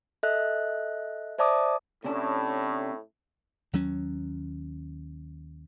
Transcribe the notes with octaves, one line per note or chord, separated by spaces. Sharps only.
A4 D#5 E5 F#6
C5 D5 E5 A5 D6 D#6
A2 C3 C#4 D4
D#2 F#3 C#4